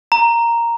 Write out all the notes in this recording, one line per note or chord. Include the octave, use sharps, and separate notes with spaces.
A#5